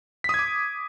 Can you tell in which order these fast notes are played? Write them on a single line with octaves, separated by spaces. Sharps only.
B6 D#6 G#6 D6